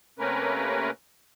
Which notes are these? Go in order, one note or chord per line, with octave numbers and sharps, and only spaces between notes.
C3 A3 A#3 C#4 A#4 B4